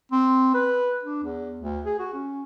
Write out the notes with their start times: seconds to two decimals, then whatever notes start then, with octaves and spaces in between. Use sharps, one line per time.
0.12 C4
0.54 B4
1.03 D4
1.23 E2
1.61 D2
1.85 G#4
1.99 F#4
2.14 C#4